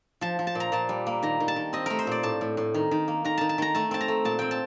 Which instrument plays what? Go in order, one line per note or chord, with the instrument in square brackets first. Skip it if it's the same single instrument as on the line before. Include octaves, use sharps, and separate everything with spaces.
[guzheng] F3 A5
F3
A5
A#2
A#5
A#2 A5
G3
A#3
D#3 A#5
D#3
A5
D#3
C4 D#5
A3 A#4
C5
A#2 D5
A2 A5
A2
A2
D#3
D#3
A#3
D#3 A#5
D#3 A5
A5
D#3 A#5
A3 A5
C4 A5
A#5
A3
A#2 A5
C4 G5
A5